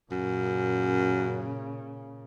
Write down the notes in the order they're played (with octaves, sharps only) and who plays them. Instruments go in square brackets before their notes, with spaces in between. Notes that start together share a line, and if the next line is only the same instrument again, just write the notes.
[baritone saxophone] F#2 [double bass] A#2 C#3